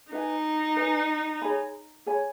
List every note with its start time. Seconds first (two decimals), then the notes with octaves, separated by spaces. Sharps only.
0.12 D#4 B4 D#5 G#5
0.76 B4 D#5 G#5
1.42 G#4 C#5 G#5 B5
2.06 G#4 C#5 G#5 B5